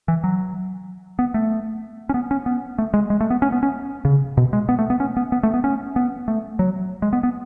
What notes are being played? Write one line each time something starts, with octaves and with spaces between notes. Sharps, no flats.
E3
F#3
B3
A3
C#4
B3
C#4
B3
A3
G#3
G#3
A3
B3
C#4
B3
C#4
C#3
B2
G#3
B3
A3
B3
C#4
B3
B3
A3
B3
C#4
B3
A3
F#3
G#3
B3
B3